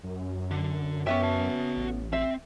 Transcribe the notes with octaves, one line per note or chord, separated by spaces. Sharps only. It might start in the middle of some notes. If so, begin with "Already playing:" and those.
F#2
D3
B3 C#4 G4 B4 E5 G5
F#4 A5
A1
C4 E5